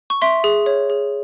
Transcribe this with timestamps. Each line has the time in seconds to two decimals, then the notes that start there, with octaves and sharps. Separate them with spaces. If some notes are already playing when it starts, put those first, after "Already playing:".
0.10 C#6
0.22 E5 C6
0.44 G#4
0.66 C#5
0.90 G#4